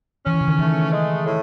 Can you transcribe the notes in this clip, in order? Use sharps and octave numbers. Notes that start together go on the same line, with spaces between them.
E3 C#4
D#3
C#3
D#3
E3 A3
G#3
A2